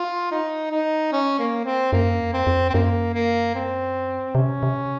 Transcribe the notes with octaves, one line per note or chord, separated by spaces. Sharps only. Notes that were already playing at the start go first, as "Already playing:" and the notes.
Already playing: F4
D#4
D#4
C#4
A#3
C4
F#2 A#3
F2
C4
F2
C4
F#2 A#3
A#3
C4
C3 C#4
C3